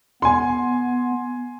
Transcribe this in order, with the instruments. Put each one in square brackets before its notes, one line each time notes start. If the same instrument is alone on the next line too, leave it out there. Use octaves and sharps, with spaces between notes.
[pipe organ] B3 [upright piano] G#5 C6